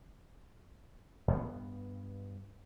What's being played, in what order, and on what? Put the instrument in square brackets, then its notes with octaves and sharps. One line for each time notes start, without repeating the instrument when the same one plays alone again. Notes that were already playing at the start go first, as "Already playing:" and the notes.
[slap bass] G2 B3